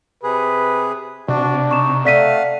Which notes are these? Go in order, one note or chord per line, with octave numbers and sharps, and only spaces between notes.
C3 G#4 B4
C3 D4 F#4
D#4 C#6 E7
A3 D5 F5 F#5 B6 D#7